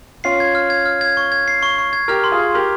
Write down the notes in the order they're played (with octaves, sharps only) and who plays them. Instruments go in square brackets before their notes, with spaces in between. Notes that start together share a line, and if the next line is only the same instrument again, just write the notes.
[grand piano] C#4 F4 [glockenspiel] C7
[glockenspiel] G#6
F6
G#6
F6
G#6
C#6
G#6
C7
C#6
C#6
G#6
[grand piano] G4 A#4 [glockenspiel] F6
[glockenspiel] C6
[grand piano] F4 G#4
[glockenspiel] G#6
[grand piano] G4 A#4 [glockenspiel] C6